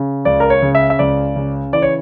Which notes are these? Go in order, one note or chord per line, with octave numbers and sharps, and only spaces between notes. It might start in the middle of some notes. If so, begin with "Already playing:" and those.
Already playing: C#3
C#2 D5
A#4
C#5
C#3
E5
E5
C#2 D5
C#3
E3 D5
C#5